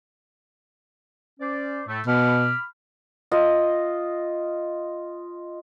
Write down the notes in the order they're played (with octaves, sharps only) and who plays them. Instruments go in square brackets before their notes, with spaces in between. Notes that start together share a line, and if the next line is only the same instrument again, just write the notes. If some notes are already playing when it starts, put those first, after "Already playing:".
[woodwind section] C#4 C5 D5
A2 A3
[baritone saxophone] B2 [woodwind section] B5 D6 F6
[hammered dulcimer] F4 D#5